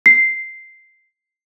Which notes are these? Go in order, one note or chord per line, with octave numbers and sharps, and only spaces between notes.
C7